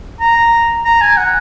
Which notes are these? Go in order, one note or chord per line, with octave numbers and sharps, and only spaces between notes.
A#5
A#5
G#5
F#5